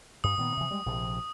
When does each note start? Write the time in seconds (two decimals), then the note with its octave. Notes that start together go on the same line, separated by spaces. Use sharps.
0.24 G2 D#6
0.37 A#2 D#3 B3
0.57 C3 E3
0.71 G3 G#3
0.86 A#1 C3 F3